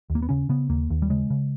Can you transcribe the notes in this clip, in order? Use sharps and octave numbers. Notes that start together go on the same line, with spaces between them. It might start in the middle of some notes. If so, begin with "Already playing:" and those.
D#2
A#3
B3
C#3 C#4
C#3 B3
D#2 A#3
D#2
G3
C#3 G#3
C#3